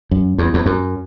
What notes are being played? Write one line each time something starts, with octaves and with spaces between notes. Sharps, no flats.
F#2
E2
E2
F#2